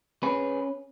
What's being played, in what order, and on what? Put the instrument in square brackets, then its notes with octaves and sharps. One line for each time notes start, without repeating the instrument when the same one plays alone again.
[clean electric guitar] C#4 G#4 B4